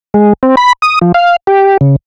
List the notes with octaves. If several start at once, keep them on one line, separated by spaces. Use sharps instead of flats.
G#3
C4
B5
D#6
F3
F5
G4
C#3